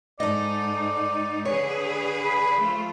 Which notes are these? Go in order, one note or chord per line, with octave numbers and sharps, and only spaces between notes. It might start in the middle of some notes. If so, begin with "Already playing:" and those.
G#2 D#4 A4 D5 D#5
D3 G#4 B4 C#5
B5
F3 A3 F4